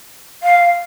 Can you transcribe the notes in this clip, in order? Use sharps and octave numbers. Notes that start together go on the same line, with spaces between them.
F5